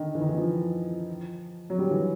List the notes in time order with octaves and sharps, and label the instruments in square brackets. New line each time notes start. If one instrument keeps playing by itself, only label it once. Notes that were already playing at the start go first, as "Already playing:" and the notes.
Already playing: [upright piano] D3 D#3
E3
D#3
E3
F3
F#3
G3
E3